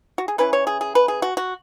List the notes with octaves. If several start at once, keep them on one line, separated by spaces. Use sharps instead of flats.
F#4
G#4
E3 C#4 E4 B4
C#5
G#4
G#4
B4
G#4
F#4
F#4